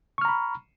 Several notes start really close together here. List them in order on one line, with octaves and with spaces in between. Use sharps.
C#6 F6 A#5 B5